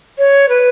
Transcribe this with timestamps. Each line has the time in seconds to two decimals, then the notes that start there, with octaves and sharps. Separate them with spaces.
0.18 C#5
0.49 B4